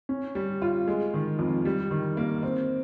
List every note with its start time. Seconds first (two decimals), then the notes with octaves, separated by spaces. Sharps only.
0.09 C#4
0.35 G3
0.62 F4
0.88 G#3
1.14 D#3
1.39 F2
1.65 G3
1.91 D#3
2.17 A#3
2.42 C4